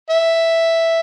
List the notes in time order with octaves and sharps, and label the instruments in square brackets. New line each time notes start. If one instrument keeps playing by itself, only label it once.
[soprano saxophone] E5